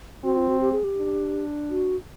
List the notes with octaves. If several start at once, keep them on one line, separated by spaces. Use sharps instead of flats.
C4 F#4
F4
F#4
G4
G#4
G4
D4
F#4